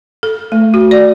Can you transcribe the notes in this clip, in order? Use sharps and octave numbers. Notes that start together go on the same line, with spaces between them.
A4
A3
F#4
D5